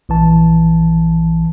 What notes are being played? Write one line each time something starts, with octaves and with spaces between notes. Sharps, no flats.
A#1 E3 A5